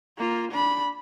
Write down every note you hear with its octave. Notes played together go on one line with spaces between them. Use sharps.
A#3 F4
D4 B5